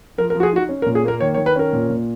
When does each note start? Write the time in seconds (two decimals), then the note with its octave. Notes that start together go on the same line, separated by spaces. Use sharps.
0.18 F3 A#4
0.30 A#4
0.35 F3
0.40 F#4
0.43 G#4
0.53 D#4 F#4
0.69 C#4
0.82 A#4
0.86 A#2
0.95 G#4
1.04 A#3 A#4
1.20 D#3 C#5
1.34 C#5
1.38 D#3
1.46 B4
1.56 C#4 A#4
1.73 A#2
1.90 A#2